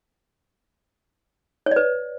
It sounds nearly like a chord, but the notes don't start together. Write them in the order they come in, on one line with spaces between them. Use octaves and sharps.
C#5 D5 B4